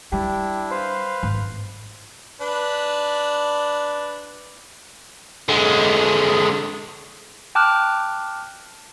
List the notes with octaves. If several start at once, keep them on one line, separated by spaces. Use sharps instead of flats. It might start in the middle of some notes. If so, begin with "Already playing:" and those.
G3 D4 E4 G4
B4 C5 F5
G#1
D4 B4
D3 G#3
G5 A5 D6 F6 F#6